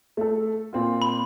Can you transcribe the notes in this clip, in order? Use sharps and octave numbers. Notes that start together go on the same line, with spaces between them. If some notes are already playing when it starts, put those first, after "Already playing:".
A3 A4
A#2 C4 F4
B5